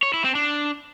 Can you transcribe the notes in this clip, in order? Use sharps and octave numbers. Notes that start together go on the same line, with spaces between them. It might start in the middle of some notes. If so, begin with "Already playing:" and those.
C#5
E4
C4
D4